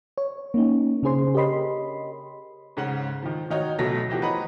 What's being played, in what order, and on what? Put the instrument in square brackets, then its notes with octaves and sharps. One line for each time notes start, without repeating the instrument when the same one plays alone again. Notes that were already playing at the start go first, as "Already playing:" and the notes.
[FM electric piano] C#5
A#3 C#4 D#4
C#3 C#4 D4 G#4 C5 C6
G4 A#4 C#5 D#5 B5 C6
[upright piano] G#2 C#3 F#5
D#3 F3
D#3 D#4 F#4 C#5
D2 B2 F#3 A3 A#6
E3 F3 F#4 G4
B4 C#5 D#5 F#5 A#5 B5